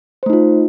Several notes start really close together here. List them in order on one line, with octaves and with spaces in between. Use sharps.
C5 A3 D#4 F4